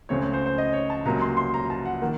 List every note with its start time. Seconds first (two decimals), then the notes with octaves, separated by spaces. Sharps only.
0.09 C#2 C#3 A3 C4 C#5
0.21 C#5
0.34 C5
0.46 C5
0.58 D#5
0.73 C#5
0.90 A5
1.05 C#2 C3 F#3 A#3 A#5
1.21 C6
1.37 C6
1.54 A#5
1.70 A5
1.85 F#5
2.02 D#3 A#3 F#5